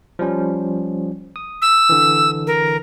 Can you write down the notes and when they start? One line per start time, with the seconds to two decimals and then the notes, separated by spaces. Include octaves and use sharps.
0.19 F3 G3 C#4
1.36 D#6
1.62 E6
1.89 D3 E3
2.47 A#4